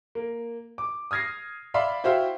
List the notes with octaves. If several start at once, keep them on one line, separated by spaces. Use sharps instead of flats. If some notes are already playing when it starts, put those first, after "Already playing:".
A#3
D6
D#6 F6 G#6 A#6 C7
D5 E5 F5 B5 C6
E4 F#4 C5 E5 F5 G5